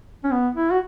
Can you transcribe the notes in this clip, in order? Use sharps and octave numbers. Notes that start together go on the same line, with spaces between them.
C#4
B3
E4
F#4